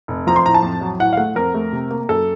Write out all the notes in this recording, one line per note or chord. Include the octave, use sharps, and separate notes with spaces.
F1
F3 A#5
C6
A2 A#5
A5
F2
F#3
A2 F#5
F5
A3 F#5
F2 A#4
A3
C3
A#3
F#2 A4